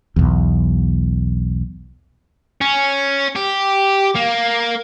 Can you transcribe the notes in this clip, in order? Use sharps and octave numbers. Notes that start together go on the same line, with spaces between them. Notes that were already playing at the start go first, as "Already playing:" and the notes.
B1 E2
C#4
G4
A#3